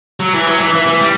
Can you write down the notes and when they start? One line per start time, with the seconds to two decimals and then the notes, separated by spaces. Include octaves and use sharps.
0.20 F#3
0.33 E3
0.47 F#3
0.60 E3
0.74 E3
0.87 E3
1.00 G3